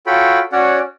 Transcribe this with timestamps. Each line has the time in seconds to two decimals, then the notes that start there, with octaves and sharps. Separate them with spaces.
0.06 F4 F#4 A4 C#5 G5 B5
0.52 C#4 F#4 C#5 D5 F#5